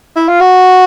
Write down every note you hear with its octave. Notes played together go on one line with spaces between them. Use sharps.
E4
F4
F#4